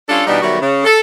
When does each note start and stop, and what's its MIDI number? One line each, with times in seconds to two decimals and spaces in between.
0.09 0.22 55
0.09 0.22 61
0.09 0.22 62
0.09 0.22 65
0.09 0.22 69
0.27 0.39 47
0.27 0.39 52
0.27 0.39 55
0.27 0.39 59
0.27 0.39 62
0.27 0.39 63
0.42 0.60 51
0.42 0.60 54
0.42 0.60 55
0.42 0.60 57
0.42 0.60 59
0.42 0.60 66
0.61 0.83 49
0.85 1.00 69